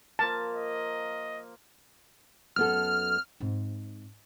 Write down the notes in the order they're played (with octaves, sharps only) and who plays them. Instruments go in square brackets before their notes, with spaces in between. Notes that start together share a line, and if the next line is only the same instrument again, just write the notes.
[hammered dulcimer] F3 A#3 A#4 [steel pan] A5
[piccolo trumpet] D#5
[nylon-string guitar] F#2 B3 A4 [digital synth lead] F6
[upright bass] G#2 C4